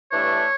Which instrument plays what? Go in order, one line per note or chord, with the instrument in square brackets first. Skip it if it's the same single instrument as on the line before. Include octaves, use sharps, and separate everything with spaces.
[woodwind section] G2 E3 A3 D4 C#5